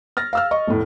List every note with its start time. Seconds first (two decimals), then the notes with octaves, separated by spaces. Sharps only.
0.17 F6 A6 A#6
0.33 F5 E6 F6
0.51 D#5 C#6
0.68 F1 A2